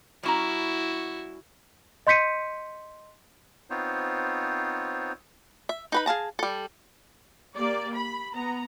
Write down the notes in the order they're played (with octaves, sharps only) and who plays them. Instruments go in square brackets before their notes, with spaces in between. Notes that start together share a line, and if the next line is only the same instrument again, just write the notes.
[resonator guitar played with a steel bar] G3 C#4 A#5 [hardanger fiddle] E4 F#4
[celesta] D#5 C6 G6 B6 C#7 D#7
[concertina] B3 C4 D#4 F4 C5 C#5
[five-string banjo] E5
D#4 B4 B5
G#4 F5 A5 A#5
G3 A4
[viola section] A#3 G4 D5
B5
B3 A#5